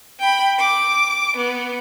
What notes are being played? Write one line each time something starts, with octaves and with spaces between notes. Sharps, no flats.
G5 B5
D6
B3